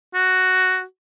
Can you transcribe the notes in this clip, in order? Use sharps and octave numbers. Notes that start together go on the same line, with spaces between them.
F#4